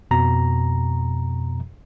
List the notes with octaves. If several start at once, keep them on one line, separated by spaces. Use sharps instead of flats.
F2 B2 A#5